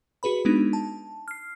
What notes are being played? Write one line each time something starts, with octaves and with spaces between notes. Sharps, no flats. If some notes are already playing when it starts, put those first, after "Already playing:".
F#4 G#4 B4 B5
G#3 B3 D4 D#4
A5
F6 C7